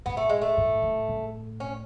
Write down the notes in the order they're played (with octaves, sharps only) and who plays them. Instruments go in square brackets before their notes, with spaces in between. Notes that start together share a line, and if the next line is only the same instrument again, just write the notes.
[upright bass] A2 [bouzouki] B3
[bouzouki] A3
G#3
A3
[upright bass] A2
A2
A2
[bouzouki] C#4